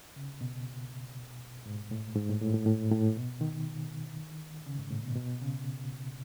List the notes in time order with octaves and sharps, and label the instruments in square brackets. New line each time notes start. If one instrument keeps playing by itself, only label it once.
[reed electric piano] C#3
B2
G#2
A2
G#2
A2
A2
A2
A2
A2
B2
D#3
C#3
G#2
A2
B2
B2
C#3